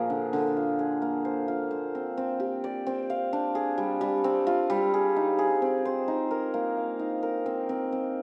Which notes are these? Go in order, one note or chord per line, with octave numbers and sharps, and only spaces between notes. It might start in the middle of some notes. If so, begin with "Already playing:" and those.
Already playing: A#2 F3 A#3 G#4
D3
D3
F4
G#4
A#3
C5
F4
C5
C4
C4
G4
D5
C4
F5
D4
G#4
G3
G3
C4
F4
G3
G#4
D#4
G#4
C4
C5
D#4
A#4
A#3
F5
D#4
A#4
C4
C4
C4